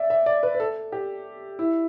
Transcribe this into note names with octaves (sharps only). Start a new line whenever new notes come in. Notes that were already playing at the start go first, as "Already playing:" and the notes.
Already playing: D5 E5
E5
D5
B4
B4
A4
G4
E4